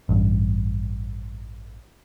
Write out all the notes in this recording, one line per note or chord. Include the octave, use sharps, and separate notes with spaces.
A1 G2